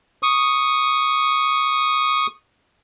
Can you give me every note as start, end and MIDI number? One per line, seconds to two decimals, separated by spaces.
0.23 2.27 85
0.23 2.27 87